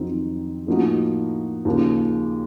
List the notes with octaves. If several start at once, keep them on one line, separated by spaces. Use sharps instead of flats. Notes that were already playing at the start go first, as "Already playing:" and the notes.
Already playing: F2 D#3 F#3 C4 D#4
A2 F3 A#3 D#4 F#4
D#2 C#3 F3 A#3